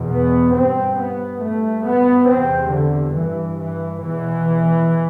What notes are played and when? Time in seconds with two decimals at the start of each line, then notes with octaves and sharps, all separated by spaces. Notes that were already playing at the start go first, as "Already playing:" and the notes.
Already playing: E2 B2
0.12 B3
0.55 G2 C4
0.98 B3
1.42 G2 A3
1.86 B3
2.29 E2 C3 C4
2.73 D3
3.15 G2 E3
3.59 E3
4.02 E2 B2 E3